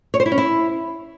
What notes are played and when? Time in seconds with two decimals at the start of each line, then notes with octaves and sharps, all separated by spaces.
0.14 C#5
0.20 C5
0.26 E4
0.32 C#4
0.38 E4